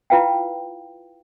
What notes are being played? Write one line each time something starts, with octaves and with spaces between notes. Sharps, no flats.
E4 F4 B4 F5 G5